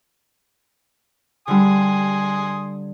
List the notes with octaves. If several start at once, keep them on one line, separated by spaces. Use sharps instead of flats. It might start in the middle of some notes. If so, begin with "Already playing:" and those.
D3 G3 G#5 C6 D#6